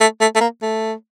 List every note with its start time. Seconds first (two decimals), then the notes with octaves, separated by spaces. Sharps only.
0.01 A3
0.21 A3
0.35 A3
0.41 A#3
0.62 A3